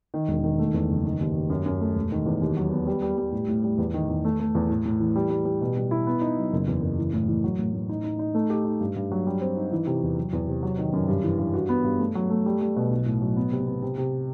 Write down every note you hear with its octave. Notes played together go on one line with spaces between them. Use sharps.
D#3
E1
D#3
A3
E2
F#1
D#3
D#2
D#2
F#2
F#2
A3
E1
D#3
E2
D#2
F#3
B3
G3
G3
G3
A2
A2
G3
E2
D#3
E2
A3
A3
E2
A2
A2
E3
G3
G3
G3
B2
G3
E4
B3
D#4
F#3
F#1
E2
F#1
E3
A2
E3
F#3
A2
A2
D#4
D#4
D#4
A3
G4
D#4
G2
G2
F#3
G3
C4
D#4
E3
C3
E2
F#3
E2
C3
F#3
D#3
F#2
G2
E3
G2
F#4
B3
G2
A3
F#3
A3
G3
G3
B2
B1
A2
F#3
B3
C3
B3
C3
C3